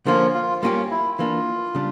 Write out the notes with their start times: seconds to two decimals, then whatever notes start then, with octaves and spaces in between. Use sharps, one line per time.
0.06 D3 F3 A#3 C#4 F4
0.34 F4
0.62 G3 A#3 C#4 E4 F4 G4
0.91 E4
1.19 E3 A#3 D4 F4
1.75 C#3 G3 D4